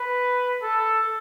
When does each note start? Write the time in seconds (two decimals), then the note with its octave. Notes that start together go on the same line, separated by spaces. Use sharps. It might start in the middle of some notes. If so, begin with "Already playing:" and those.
Already playing: B4
0.62 A4